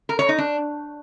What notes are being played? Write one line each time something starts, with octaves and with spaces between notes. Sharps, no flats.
A#4
C#5
D#4
D4